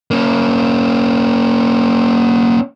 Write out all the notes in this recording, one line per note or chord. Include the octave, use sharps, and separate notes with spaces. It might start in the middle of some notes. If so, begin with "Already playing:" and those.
A#3 C#4